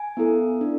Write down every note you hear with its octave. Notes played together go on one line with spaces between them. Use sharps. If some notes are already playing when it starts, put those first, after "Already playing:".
Already playing: G#5
B3 E4 A4
D4